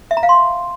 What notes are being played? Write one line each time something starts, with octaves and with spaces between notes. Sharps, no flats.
E5
A#5
F5
C6